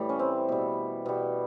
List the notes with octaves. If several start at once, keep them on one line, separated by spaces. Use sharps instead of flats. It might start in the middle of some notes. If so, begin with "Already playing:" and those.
Already playing: A2 E3 G3
C#4
C4
B2 G3
B2 G3